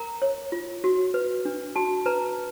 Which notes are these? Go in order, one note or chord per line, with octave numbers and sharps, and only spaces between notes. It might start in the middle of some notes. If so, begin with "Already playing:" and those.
Already playing: A#4 A#5
C#5
F4
F#4
B4
D4
F#4 A5
B4 A#5